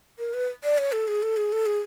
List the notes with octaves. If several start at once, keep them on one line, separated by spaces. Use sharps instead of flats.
A#4
B4
D5
C#5
A4
G#4
A4
G#4
A4
G#4